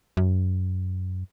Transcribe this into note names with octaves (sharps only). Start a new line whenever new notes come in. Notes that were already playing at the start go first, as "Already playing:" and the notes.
F#2